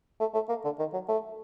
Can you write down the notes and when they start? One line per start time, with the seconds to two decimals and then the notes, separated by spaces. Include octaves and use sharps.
0.20 A3
0.34 A3
0.49 A#3
0.64 D3
0.79 D#3
0.93 F#3
1.08 A3